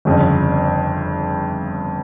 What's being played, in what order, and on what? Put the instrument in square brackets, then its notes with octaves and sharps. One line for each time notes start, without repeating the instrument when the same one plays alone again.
[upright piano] G1 F2 C#3